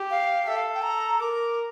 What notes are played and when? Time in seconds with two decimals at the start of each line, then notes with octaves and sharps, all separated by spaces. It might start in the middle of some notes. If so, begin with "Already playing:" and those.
Already playing: G4
0.11 F5
0.47 A4 E5
0.56 F5
0.74 G5
0.83 A#5
1.20 A#4 D6